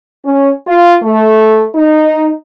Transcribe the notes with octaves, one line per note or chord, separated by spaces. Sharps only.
C#4
F4
A3
D#4